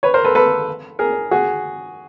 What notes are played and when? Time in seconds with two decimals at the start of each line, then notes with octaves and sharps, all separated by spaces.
0.03 B4 C#5
0.14 A#4 C5
0.24 A4 B4
0.35 A4 B4
0.99 G#4 A#4
1.31 F#4 G#4